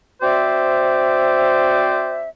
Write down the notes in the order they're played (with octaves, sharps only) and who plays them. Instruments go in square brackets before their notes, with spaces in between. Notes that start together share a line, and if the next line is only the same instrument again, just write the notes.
[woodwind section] C4 F#4 C5 D5 E5